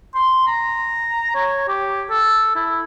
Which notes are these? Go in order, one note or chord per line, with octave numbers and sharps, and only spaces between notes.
C6
A#5
C#5
G4
A4
E4